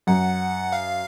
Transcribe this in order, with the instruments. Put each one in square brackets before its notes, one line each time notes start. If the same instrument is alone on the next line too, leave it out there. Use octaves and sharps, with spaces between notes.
[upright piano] F#2 [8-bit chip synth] F#5
[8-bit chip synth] F5